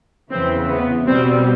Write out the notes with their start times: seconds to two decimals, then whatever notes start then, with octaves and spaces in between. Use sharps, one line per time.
0.31 E2 C#3 E3 C4
0.69 B3
1.07 B2 G3 C4